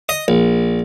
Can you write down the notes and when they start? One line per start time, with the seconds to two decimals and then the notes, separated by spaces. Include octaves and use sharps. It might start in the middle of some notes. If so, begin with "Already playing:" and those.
0.09 D#5
0.28 A#1